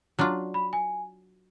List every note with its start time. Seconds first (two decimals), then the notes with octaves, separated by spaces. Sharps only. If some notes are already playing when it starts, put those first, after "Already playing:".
0.19 F#3 D4 F4 A#5
0.54 B5
0.73 G#5